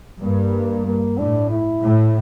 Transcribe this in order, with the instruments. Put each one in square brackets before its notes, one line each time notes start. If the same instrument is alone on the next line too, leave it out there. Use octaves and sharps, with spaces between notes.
[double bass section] G2 [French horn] A#3
[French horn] A#3
[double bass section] A2 [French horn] D4
[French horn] E4
[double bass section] A2